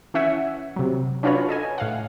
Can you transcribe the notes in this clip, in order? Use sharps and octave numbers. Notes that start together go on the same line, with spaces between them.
E3 C#4 E5 F#5 G#5
C3 F#3
C#4 D4 F4 F#4 B4 C#5
A4 D#5 G#5
A2 F5 F#5